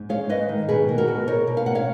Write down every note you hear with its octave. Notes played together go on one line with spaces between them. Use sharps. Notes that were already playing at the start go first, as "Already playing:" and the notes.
Already playing: G#2
G#3 C#5 F5
G#2 B4 D#5
D#3
B2 G#4 B4
A#3
F#4 A#4
B2
D#4 A#4 C#5
B2
F5
A#3 F#5
C#5 F5